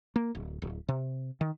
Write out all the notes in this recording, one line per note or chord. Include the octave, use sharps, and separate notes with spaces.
A#3
D1
D1
C3
D#3